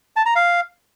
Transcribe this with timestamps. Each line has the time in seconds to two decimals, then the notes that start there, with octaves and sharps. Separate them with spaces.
0.16 A5
0.26 A#5
0.36 F5